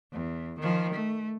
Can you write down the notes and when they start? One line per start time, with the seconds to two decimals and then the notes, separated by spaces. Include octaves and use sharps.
0.12 E2
0.60 D#3 F3
0.94 A3